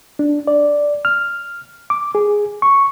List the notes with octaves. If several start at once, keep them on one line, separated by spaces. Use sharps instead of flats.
D4
D5
F6
D6
G#4
C#6